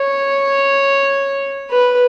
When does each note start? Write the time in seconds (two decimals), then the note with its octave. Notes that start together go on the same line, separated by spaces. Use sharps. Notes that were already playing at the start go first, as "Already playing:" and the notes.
Already playing: C#5
1.71 B4